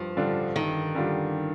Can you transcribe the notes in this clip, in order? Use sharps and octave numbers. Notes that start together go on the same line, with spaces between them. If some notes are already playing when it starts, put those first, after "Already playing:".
Already playing: G2 F3
D3 G3 D4 F4
G2 D#3
D3 G3 D4 F4